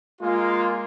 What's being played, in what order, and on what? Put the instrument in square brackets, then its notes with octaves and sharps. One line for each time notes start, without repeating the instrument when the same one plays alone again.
[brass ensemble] G#3 A#3 F4